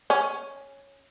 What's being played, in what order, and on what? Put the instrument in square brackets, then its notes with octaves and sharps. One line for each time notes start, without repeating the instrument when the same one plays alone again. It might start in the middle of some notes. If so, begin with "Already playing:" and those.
[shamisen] C#4